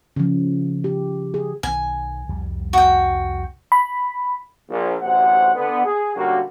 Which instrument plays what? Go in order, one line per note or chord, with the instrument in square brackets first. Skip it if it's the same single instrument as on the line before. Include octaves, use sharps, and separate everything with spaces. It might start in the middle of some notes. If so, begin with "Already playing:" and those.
[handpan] C#3 F3
G4
G#4
[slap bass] B1 D#3 [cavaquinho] G#5
[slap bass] C2 F2 G3
[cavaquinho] F#4 G5
[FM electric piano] B5
[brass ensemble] A#1
A1 D2 C3 C5 F#5
D3 B3
G#4
F#2 A#2 D3 G3 A#3 F#4